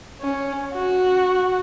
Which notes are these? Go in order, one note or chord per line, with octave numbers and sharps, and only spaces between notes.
C#4
F#4